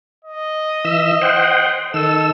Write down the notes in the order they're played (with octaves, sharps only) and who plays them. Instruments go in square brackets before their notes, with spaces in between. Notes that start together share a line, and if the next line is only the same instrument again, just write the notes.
[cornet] D#5
[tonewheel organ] E3 E5 E6
C5 F#5 G5
[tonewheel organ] D#3 E6 [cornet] A4